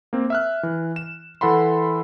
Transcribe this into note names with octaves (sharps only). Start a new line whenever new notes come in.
A#3 C4
E5 F6 F#6
E3
E7
E3 A4 F#5 B5 C6